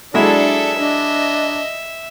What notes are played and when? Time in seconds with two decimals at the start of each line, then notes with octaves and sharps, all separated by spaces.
0.14 F#3 G#3 D4 E4 A4 E5
0.78 D4 D#5